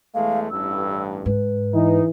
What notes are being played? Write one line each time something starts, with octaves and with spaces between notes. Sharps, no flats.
E2 G#3 A3 F5
A1 G2 E6
G#2 B4
E3 D#4